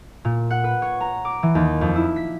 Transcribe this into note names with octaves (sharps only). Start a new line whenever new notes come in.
A#2
F#5
B4
C#5
A#5
D6
E3
D#2
F2
E4
B6